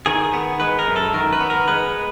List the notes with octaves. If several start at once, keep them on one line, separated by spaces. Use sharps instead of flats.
D#3 G#4
B3
G#3 B4
A#4
F#2
A4
D#3 A#4
B4
B3
A#4
G#3 B4